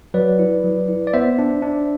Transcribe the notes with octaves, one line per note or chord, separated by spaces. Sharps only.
F#3 B4 D5
E4
F#3
E4
D5
B3 C5 E5
D4
D4